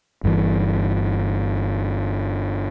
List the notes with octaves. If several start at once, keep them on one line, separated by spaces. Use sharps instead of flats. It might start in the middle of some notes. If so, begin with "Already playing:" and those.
G1 G2 C#3 E3